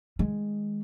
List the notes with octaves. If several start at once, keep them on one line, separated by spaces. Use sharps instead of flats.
D#3 G#3